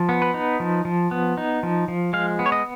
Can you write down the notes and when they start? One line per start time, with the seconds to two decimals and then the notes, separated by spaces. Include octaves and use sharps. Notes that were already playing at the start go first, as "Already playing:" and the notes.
Already playing: F3
0.09 B3
0.22 B4
0.34 D#4
0.60 F3
0.85 F3
1.11 B3
1.37 D#4
1.63 F3
1.88 F3
2.13 G#3 F5
2.39 B3
2.46 C#5
2.52 D#5